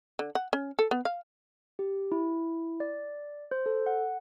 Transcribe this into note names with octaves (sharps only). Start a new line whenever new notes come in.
D3
F#5
C#4
A4
B3
F5
G4
E4
D5
C5
A4
F#5